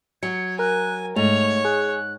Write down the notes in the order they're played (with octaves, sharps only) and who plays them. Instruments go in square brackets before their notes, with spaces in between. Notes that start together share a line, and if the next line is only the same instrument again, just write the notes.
[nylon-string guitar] F#3 [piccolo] G#6 [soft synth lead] C#7
[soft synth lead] A#4 [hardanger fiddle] G#5 [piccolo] F#6
[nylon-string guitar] G#2 [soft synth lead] A3 [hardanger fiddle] C#5 [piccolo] F7
[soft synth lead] G#4 [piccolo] F#6